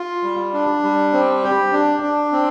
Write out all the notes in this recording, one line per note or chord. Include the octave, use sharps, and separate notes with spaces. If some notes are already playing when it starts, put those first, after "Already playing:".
Already playing: F4
G3
D4
G3
C4
G4
D4
D4
C4